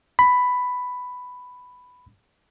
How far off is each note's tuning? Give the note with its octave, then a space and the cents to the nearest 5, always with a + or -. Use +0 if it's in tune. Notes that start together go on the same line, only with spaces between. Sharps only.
B5 +10